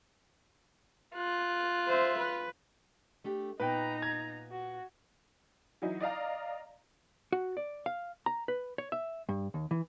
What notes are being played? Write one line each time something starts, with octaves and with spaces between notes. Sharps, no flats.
F4 F#6
C5 E5
B4
A3 D4 G4
A#2 B3 D#4 B4 G5 A#5
G#6
F#4
E3 F#3 D#4 E4
D5 D#5 F5 A#5
F#4
D5
F5
A#5
B4
C#5
E5
G2
D#2
E3